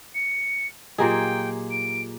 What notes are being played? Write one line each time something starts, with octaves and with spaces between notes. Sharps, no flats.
C#7
A#2 F#3 A#3 G4 G#4 D#5 G5
D7